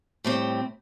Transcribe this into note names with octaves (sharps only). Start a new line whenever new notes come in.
A2 G3 C4